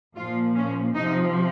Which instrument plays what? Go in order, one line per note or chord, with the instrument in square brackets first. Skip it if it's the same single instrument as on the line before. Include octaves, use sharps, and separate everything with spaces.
[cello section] A#2 F3 F4
C#4
C3 F3 D#4